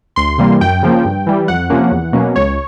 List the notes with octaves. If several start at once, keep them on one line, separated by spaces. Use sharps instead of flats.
D2 C6
C3 E3 G3 A#3
F#2 G5
C#3 F3 A#3
G2
E3 G3
F2 F#5
C3 F3 A#3 C#4
E2
B2 F#3 A#3 C#4
C#2 C#5